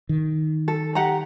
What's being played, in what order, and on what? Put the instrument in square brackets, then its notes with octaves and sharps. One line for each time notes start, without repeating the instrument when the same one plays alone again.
[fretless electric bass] D#3
[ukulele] A4
G4 F#5 A#5